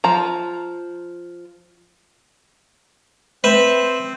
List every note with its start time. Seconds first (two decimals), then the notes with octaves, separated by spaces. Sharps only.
0.04 F3 A#5
3.44 C4 B4 C5 E5